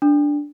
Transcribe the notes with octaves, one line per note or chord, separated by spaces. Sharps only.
D4